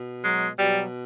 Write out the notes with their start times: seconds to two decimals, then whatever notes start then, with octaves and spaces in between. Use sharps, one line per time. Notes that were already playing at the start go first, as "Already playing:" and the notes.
Already playing: B2
0.23 F#3 G#3
0.57 B2 F#3 G3